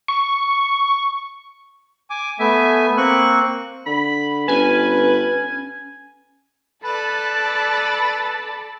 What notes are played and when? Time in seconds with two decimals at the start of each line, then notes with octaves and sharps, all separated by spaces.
0.08 C#6
2.10 G#5 D6
2.39 A3 B3 E5 G#5
2.97 A#3 C4 C#6 F#6
3.86 D3 B5
4.48 G1 C#4 B4 G#5
6.85 A4 B4 D5 A5 B5